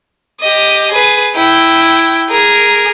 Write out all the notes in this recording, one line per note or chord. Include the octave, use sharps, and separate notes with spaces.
G4 D#5
G#4 B4
E4 G5
G#4 A#4